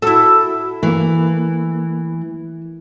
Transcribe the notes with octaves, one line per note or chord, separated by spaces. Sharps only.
E4 F#4 A4 E6
E3 A3 A#3